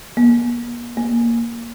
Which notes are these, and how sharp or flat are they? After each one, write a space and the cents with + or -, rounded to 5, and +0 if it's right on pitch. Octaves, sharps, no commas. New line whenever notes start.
A#3 +40
A#3 +0